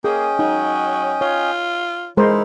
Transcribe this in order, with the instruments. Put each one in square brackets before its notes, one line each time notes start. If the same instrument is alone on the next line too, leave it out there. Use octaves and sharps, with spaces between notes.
[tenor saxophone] A#3 [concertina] C#4 D#5 G5 [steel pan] G#4
[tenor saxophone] F#3 [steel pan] D#4
[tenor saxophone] F4 [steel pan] C#5
[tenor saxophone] E3 [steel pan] G#3 A#4 C5 [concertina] D#4 E4